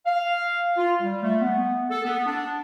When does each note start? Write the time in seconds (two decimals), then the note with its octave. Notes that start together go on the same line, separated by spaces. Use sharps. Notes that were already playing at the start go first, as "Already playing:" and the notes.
0.06 F5
0.77 F4
1.01 G3
1.23 A3
1.42 B3
1.91 A4
2.05 B3
2.27 D4